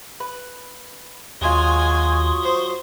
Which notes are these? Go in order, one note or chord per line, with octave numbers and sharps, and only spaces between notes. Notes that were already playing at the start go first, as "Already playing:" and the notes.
B4
D#2 F#3 G#3 F4 G#5 C6 C#6 D#6
C5